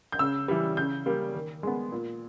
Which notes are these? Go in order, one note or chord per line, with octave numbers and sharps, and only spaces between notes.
G6
C#3 E6
E3 G3
C#3 G6
G3 A#3
D#3
G#3 B3
A#2